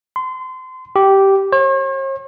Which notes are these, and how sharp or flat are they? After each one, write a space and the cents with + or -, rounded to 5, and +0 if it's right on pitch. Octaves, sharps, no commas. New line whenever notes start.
C6 -30
G4 -10
C#5 -45